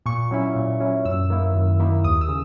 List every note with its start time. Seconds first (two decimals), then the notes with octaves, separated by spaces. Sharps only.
0.06 A#2 C#6
0.31 F#3 C#4 E4
0.56 A#2
0.80 F#3 C#4 E4
1.05 F#2 E6
1.30 D#3 A#3 E4
1.55 F#2
1.80 D#3 A#3 E4
2.04 D#2 D#6
2.21 E6
2.28 C#3